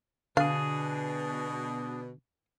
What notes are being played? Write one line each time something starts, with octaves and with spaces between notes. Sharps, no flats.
B2 D3 D4 G#4 F5